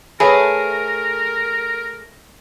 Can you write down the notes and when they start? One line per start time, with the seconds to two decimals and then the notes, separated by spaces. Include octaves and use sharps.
0.20 A3 G#4 A#4 B4 C#5 B5